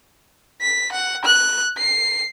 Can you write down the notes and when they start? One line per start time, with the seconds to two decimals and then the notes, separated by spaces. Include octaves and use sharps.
0.62 B6
0.92 F#5
1.25 F#6
1.77 C7